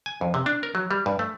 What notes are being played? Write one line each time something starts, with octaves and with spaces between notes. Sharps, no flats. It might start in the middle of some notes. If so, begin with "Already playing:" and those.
G#5
F2
C3
D4
A#4
F#3
G3
G2
A3